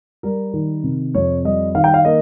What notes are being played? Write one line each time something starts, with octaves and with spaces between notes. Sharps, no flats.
G3 A#4
D#3
C3
F2 C#5
G3 D#5
D#3 F5
G5
F5
A#3 D#5